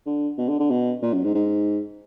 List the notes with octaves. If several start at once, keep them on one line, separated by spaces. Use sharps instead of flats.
D3
B2
D3
D3
B2
A#2
F#2
G#2
G#2